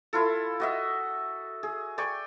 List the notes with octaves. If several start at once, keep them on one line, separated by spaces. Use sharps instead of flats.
E4 F4 A4
F#4 D#5 E5
G#4
D5 G5 G#5 C#6